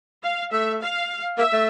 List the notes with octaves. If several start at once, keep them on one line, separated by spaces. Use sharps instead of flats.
F5
A3 E5
F5
A#3 E5
A3